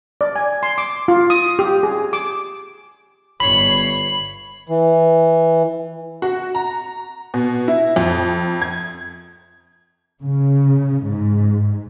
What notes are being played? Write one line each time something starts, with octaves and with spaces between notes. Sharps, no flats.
D5
G#5
C6
D6
F4
D#6
G4
G#4
D6
G1 C#5 B5 C7 F#7
E3
F#4
A#5
B2
E4
F2
G#6
C#3
G#2